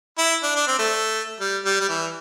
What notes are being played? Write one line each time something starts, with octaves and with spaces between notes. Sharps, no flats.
E4
D4
D4
C4
A3
G3
G3
G3
E3